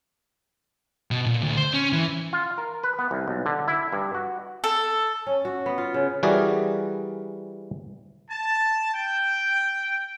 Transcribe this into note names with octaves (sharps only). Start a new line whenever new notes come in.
B2
A#2
D2
C5
C#4
E3
F4
A#4
B4
B3
C2
B1
D3
E4
G2
F#4
A4
C#4
F#4
B3
F4
C#3
E3 G3 F#4 G#4 A#4 D5
A5
G5